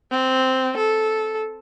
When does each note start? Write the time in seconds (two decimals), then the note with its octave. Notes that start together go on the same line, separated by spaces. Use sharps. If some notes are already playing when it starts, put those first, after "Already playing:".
0.11 C4
0.77 A4